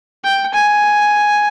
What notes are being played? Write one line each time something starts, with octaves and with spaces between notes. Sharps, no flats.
G5
G#5